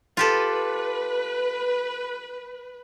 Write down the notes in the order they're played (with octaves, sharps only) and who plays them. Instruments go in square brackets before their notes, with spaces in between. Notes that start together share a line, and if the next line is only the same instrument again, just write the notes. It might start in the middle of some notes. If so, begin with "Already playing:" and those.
[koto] F4 G4 A4 [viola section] B4